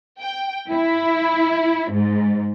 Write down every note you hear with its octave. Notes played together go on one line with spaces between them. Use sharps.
G5
E4
G#2